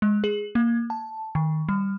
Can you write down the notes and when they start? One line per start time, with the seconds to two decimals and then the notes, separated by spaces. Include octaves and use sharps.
0.02 G#3
0.24 G#4
0.55 A#3
0.90 A5
1.35 D#3
1.69 G3